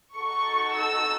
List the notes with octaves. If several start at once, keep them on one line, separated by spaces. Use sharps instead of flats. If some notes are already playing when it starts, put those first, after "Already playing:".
D#4 F#4 A4 C#6
E6